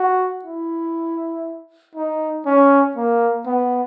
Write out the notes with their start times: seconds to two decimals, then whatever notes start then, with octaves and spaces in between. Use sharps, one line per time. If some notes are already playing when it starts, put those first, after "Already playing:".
Already playing: F#4
0.45 E4
1.95 D#4
2.46 C#4
2.97 A#3
3.46 B3